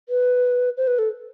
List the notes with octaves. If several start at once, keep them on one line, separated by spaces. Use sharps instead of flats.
B4
C5
B4
A4